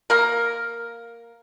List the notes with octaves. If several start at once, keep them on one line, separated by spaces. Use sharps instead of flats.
A#3 A#4